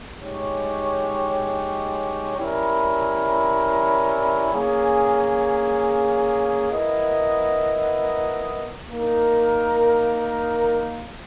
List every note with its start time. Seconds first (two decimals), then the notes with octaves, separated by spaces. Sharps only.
0.19 G#3 D#4 G4 C#5
2.36 G3 C#4 E4 A#4
4.53 A#3 C#4 G#4
6.71 B3 E4 A#4 D#5
8.87 A#3 D#4 A#4